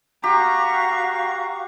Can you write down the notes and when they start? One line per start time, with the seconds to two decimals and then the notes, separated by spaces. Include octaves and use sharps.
0.24 F#4 G4 F5 A#5 C#6